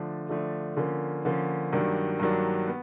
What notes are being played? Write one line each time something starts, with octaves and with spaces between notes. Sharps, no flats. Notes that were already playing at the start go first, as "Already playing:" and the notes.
Already playing: D3 F3 A3 D4
D3 F3 A3 D4
D3 F3 A#3 C#4
D3 F3 A#3 C#4
G2 D#3 F#3 A#3 D4
G2 D#3 F#3 A#3 D4
B3